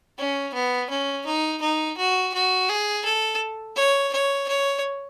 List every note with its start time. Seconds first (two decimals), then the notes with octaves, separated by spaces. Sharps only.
0.18 C#4
0.54 B3
0.89 C#4
1.26 D#4
1.61 D#4
1.97 F#4
2.34 F#4
2.69 G#4
3.05 A4
3.76 C#5
4.13 C#5
4.48 C#5